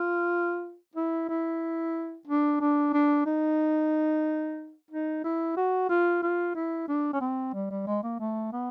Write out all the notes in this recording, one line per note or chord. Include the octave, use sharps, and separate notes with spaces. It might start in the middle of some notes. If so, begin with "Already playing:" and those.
Already playing: F4
E4
E4
D4
D4
D4
D#4
D#4
E4
F#4
F4
F4
E4
D4
C#4
C4
G3
G3
G#3
A#3
A3
B3